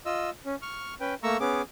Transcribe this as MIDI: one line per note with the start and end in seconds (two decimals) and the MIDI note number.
0.06 0.30 65
0.06 0.30 75
0.06 0.30 88
0.45 0.55 61
0.62 0.94 85
0.62 0.94 89
1.00 1.14 61
1.00 1.14 71
1.00 1.14 79
1.23 1.37 57
1.23 1.37 58
1.23 1.37 82
1.23 1.37 85
1.23 1.37 88
1.40 1.62 59
1.40 1.62 61
1.40 1.62 68
1.40 1.62 86